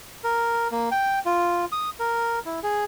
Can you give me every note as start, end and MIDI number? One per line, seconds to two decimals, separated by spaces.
0.24 0.68 70
0.72 0.89 58
0.91 1.19 79
1.26 1.65 65
1.72 1.90 87
1.99 2.39 70
2.45 2.60 64
2.63 2.85 68